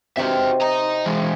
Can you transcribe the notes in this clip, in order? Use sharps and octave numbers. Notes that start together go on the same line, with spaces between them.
C3 D#4 F#4 C5 E5
D#5 A#5
E3 G#3